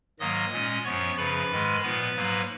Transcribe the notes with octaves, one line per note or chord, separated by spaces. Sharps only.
G#2 D#3 F#3 A#3 D#5 D#6
A#2 G#3 C#4
F#2 F3 B3 C#5 C#6
F#2 C#3 F3 B4 B5
G#2 D#3 G#3
A#2 F3 B3 B4 B5
G#2 F#3 A#3